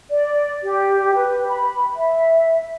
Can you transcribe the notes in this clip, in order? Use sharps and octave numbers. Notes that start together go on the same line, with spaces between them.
D5
G4
B4
B5
E5